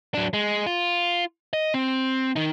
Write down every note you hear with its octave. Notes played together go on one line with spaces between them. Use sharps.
F#3 D4
G#3
F4
D#5
C4
D#3 D#4